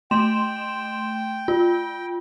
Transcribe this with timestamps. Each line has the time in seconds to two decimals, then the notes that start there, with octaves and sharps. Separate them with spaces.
0.11 A3 G5 C6 E7
1.48 F4